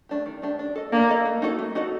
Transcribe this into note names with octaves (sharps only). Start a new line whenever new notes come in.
A3 D4 G4
D#3
A3 D4 G4
D4
A4 D#5
A#3 D4
A4 D#5
A3
D#4 F#4 A4 D#5
A3
D#4 F#4 A4 D#5